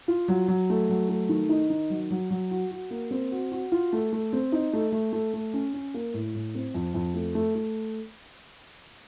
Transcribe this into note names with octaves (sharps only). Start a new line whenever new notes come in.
F4
F#3
F#3
A3
F#3
A3
D#3
D#4
D#3
F#3
F#3
F#3
F#4
F#4
A#3
C4
F#4
F#4
F4
A3
A3
C4
D#4
A3
A3
A3
A3
C#4
C#4
A#3
A2
A2
C4
F2
F2
A3
A3
A3